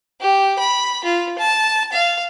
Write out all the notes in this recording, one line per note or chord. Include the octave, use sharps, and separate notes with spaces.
G4
B5
F4
A5
F5